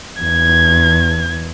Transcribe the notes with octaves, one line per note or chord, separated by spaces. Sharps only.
E2 G#6